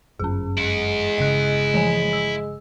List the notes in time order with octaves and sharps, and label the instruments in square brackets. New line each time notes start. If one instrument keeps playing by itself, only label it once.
[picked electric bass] G1 F#2 [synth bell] C#4 G#4
[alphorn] G#3 [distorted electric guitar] E4 F#5
[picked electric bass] G1 C#3 [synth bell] D#5 F#6
[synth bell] E3 F3 G#5
E6